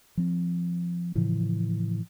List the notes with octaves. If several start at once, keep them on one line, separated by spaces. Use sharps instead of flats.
F3 C4
A2 C#3 E3 F3